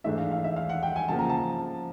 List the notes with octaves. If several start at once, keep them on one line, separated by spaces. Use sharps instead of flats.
G#2 E3 A3 D4 E5
F5
F5
E5
F5
F#5
G5
G#5
C#3 F3 A#3 A5
A#5
A5